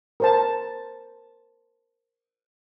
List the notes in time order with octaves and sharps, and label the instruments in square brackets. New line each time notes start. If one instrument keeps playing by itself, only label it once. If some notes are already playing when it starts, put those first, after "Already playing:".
[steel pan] A#4 C5 A5